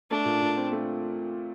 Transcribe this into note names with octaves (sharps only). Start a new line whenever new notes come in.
A3 D4
A#2
A#2
C4
A3